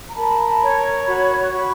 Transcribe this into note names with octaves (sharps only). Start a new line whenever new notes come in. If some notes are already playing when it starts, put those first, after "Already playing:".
A#5
A#4 A5 B5
A5 B5
C#5
F#4 B5 C#6
F#4 B5 C#6